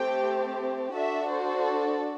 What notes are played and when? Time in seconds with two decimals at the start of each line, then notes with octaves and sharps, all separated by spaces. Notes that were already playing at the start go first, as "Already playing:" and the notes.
Already playing: A3 C4 G4 G5
0.94 D4 F#4 A4 E5
1.29 C5